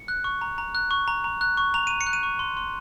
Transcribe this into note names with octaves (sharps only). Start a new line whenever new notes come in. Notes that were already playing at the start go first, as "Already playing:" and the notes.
Already playing: C#7
F#6
C#6
A#5
A#5
F#6
C#6
A#5
A#5
F#6
C#6
A#5 F7
A#5 D#7
C#7
F#6
D#7
C#6
C6
C6